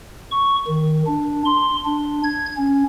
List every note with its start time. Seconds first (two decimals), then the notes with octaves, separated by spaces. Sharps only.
0.31 C#6
0.67 D#3
1.07 D4
1.45 C6
1.85 D4
2.24 G#6
2.56 C#4